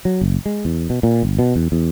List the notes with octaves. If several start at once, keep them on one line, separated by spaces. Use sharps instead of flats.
F#3
F#1
G#3
E2
B2
A#2
G1
B2
E2
E2